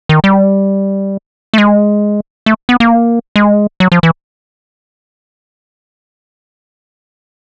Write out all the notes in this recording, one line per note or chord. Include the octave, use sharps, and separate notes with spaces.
D#3
G3
A3
G#3
A3
B3
A#3
G#3
F#3
F3
E3